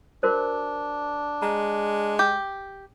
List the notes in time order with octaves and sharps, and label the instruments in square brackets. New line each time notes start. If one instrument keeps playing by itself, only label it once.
[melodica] D4 [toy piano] F#4 A#4 C5
[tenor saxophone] G#3 [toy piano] A#5
[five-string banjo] G4